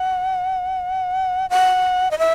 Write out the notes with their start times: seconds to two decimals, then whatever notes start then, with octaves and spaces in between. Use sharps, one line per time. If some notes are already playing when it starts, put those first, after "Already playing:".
Already playing: F#5
1.50 F#5
2.11 D#5
2.18 E5